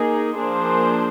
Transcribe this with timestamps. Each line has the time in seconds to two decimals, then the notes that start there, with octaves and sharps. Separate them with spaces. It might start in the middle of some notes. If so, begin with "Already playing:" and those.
Already playing: A#3 D#4 G#4
0.37 F3 A#3 D4 G#4 C5